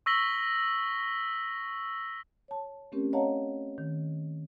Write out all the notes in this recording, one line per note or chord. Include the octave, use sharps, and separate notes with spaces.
C#6 E6 A#6 B6 F#7 G7
C#5 A5
A3 C4 C#4 G4 A#4
C#5 D#5 F5 F#5 A5 A#5
D#3